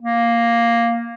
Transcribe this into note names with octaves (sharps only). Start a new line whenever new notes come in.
A#3